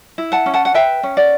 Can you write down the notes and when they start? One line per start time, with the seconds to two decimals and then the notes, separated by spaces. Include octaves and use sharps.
0.18 E4
0.32 F#5 A5
0.46 C#4
0.54 F#5 A5
0.65 F#5
0.74 B4 E5 G5
1.03 C#4
1.17 D5 F#5